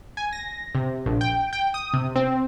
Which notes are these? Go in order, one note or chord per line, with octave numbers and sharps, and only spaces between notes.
G#5
A#6
C3
A#1
G5
G5
D#6
C3
C4